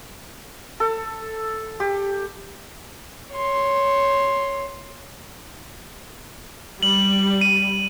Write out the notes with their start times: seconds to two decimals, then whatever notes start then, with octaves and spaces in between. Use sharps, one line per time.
0.80 A4
1.80 G4
3.33 C#5 C6
6.83 G3 F#7
7.41 D#7